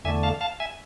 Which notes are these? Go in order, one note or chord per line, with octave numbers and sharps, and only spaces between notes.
E2 D3 A3 E5 G#5
F5 A5
F5 A5
E5 G#5